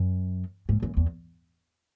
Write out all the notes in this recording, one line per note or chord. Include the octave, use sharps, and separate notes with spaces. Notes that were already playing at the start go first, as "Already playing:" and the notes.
Already playing: F#2
G#2
F#2
E2